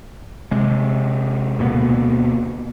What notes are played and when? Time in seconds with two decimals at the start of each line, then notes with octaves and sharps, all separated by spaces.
0.51 C3 G#3
1.59 D2 B2 A#3 B3